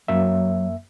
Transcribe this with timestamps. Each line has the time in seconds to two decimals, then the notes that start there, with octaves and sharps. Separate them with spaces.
0.08 F#2 F#3 A#3 E5